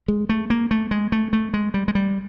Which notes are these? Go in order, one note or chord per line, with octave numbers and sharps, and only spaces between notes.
G#3
A3
A#3
A3
G#3
A3
A3
G#3
G3
G#3
G3